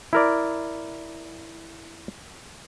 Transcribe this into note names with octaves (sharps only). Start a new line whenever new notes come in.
E4 A#4 D5